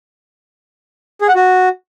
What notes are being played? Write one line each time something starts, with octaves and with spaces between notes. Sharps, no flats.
G#4
F#5
F#4